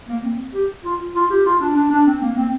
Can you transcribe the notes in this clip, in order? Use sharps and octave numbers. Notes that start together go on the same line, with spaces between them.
A#3
C4
G4
F4
F4
G4
F4
D4
D4
D4
C4
A#3
C4